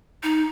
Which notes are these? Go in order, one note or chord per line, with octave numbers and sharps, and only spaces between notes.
D#4